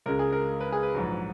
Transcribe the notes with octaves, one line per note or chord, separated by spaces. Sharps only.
C#2 C#3 G#3 A#4
G#4
A#4
B4
G#4
B4
A#1 G#2 F#3